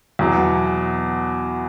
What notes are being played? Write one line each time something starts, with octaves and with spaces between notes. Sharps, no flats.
E2 B2 F#3